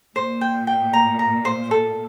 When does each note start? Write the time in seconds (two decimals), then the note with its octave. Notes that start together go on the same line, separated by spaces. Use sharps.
0.15 A#2 C5
0.41 G5
0.67 G5
0.93 A#5
1.19 A#5
1.45 C5
1.71 A4